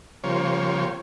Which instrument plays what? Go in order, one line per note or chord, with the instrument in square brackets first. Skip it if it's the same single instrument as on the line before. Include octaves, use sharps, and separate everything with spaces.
[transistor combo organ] C#3 F3 G3 A#3 C5 C#5